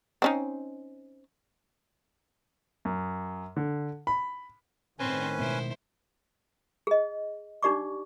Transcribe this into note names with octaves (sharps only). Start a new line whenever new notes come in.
C4 C#4 D#4
F#2
D3
B5
A2 D#3 C4 C#4 B4 C5 G#5
B2 G#3 B3 E4 C5
G#4 D#5
D4 D#4 G4 D5 C#6 D6